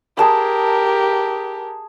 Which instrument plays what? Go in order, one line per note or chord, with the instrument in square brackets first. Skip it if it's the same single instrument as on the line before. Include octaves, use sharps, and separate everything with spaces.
[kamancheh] G4 A#4 [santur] G#4 A5 B5